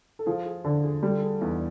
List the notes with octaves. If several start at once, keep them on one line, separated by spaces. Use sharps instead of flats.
A4
F3 G#4
G#4
D3 A4
G#4
G3 A4
A4
G#4
E2 D#4